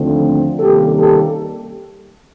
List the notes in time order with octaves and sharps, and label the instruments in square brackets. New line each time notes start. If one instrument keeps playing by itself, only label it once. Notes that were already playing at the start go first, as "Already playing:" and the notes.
Already playing: [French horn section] D#2 D3 F3 A3 C4
C3 D#3 G3 A#3 C#4 G4 A4
G4 A4